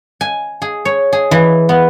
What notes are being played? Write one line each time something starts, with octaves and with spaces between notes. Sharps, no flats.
G#5
G#4
C#5
G#4
E3
B3